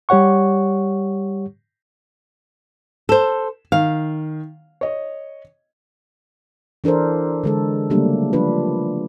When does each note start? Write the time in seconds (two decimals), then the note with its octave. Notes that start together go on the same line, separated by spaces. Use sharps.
0.09 G3 G4 C#5 F#5 C#6
3.09 A4 C5 E7
3.72 D#3 F5
4.81 C#5 D#5
6.84 E3 D4 A4 A#4 C5
7.44 D3 G#3 A4
7.90 C#3 F#3 G3 A3 A#3 D4
8.33 F3 A3 D4 F4 B4